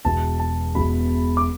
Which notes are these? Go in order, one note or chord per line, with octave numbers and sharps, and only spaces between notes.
E1 E2 B2 A5
A5
E1 E2 B2 B5
D6